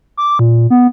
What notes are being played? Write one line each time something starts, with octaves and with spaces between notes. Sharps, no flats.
D6
A#2
B3